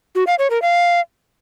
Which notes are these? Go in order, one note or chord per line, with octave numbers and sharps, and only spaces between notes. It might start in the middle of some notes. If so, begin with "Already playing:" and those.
F#4
F5
C#5
A#4
F5